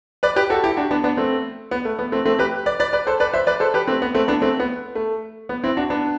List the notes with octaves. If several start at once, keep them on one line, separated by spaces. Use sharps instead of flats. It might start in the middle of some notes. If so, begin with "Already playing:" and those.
B4 D5
G4 B4
F#4 A4
E4 G4
D4 F#4
B3 D4
B3 D4
A3 C4
B3
A3
B3
A3 C4
A3 C4
G4 B4
B4 D5
B4 D5
B4 D5
A4 C5
B4 D5
C5 E5
B4 D5
A4 C5
G4 B4
A3 C4
B3
A3 C4
B3 D4
A3 C4
B3
A3
B3
C4 E4
D4 F#4
B3 D4